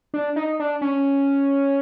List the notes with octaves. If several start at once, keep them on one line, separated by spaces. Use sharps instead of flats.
D4
D#4
D4
C#4